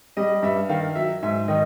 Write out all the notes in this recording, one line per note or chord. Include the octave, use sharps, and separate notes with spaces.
G3 D#5
G2 E5
D#3 F5
F#3 E5
G#2 E5
D#3 D#5